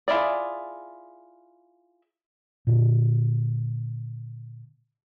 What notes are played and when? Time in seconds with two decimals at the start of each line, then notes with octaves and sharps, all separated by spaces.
0.08 E4 F4 G#4 D5
2.67 A#2 D3